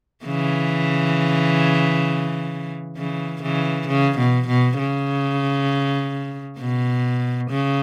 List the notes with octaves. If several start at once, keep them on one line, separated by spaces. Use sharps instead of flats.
C#3 E3
C#3 E3
C#3 E3
C#3
B2
B2
C#3
B2
C#3